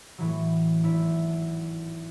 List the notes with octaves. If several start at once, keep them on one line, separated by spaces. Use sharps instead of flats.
A2 E3 F#3
G#1 E4 B6